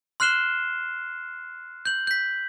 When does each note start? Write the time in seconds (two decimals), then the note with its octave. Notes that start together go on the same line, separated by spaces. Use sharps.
0.20 C6 F6 F#6 C7 E7 G7
1.86 G6 F#7
2.07 G6 B6